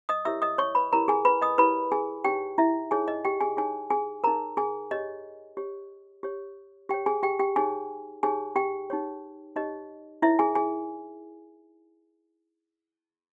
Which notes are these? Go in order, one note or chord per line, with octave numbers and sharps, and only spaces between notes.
D#5 D#6
E4 G4 A#4 C#5 E5 E6
D#5 D#6
C#5 C#6
B4 B5
E4 G4 A#4 C#5 A#5
G#4 G#5
B4 B5
D#5 D#6
E4 G4 A#4 B4 C#5 B5
G#4 G#5
D#4 G4 G#4 C#5 G5
E4 E5
D#4 G#4 C#5 G#5
D#5
G4 G5
G#4 G#5
D#4 G#4 C#5 G#5
G#4 G#5
D#4 G#4 A#4 C#5 A#5
G#4 G#5
G4 C#5 D#5
G4 C#5
G4 C#5
G4 C#5 G5
G#4 G#5
G4 G5
G4 G5
D#4 G4 G#4 C#5 G#5
D#4 G4 G#4 C#5 G#5
G4 G5
D#4 G4 C#5
D#4 G4 C#5 D#5
D#4 E4 A#4 C#5 E5
G#4 G#5
G#4 G#5